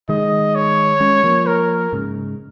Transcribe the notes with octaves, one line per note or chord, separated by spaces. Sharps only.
D#3 G#3 D#5
C#5
G#3 C#4
F3 A#3
A#4
G#2 C#3